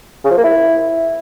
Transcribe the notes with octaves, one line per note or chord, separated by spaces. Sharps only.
C#3
F3
A#3
E4